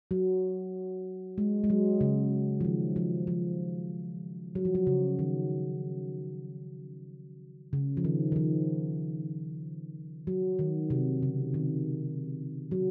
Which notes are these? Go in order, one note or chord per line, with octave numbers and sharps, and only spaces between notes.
F#3
G#3
G#3
F#3
C#3
F3
D#3
F3
F3
F#3
F3
F#3
C#3
D#3
C#3
F3
D#3
D#3
F3
F#3
D#3
C3
C#3
D#3
F#3